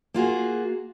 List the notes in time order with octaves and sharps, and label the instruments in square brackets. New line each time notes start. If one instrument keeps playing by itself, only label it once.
[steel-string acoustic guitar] A#3 F4 F#4 G#4